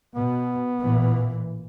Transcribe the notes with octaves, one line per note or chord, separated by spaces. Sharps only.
B2 B3
A1 A#2 E3